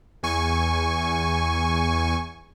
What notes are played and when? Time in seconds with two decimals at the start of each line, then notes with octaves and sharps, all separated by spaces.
0.23 E2 G#5 C#6